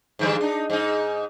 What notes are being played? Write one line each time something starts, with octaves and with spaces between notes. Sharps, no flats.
G#2 D3 G3
D4 D#4
G#2 D#4